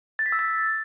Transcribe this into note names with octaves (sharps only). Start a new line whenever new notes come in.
A6
B6
E6
A6